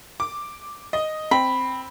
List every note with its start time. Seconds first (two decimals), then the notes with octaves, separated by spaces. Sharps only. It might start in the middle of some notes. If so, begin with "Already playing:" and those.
0.20 D6
0.93 D#5
1.31 C4 B5